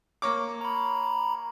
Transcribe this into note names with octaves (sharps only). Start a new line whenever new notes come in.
A#3 C#5 D6
A#5 B5